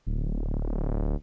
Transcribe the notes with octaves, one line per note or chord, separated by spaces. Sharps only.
D1